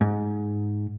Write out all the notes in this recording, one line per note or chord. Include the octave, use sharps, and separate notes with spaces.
G#2